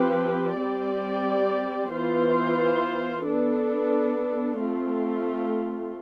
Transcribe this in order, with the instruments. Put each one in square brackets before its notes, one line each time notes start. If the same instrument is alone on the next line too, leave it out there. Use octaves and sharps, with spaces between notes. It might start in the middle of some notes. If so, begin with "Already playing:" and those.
Already playing: [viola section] F3 C4 G4 B4
G3 C4 G4 D5
E3 B3 F4 C5
B3 D4 A4
A3 C4 F4